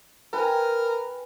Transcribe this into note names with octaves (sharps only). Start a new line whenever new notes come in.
A#4 B4 G5 G#5